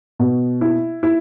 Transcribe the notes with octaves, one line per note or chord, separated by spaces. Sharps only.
B2
E4
E4